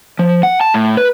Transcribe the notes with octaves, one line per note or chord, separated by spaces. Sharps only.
F3
F#5
A5
A2
B4